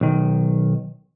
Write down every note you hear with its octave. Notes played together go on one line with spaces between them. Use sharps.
B1 D#3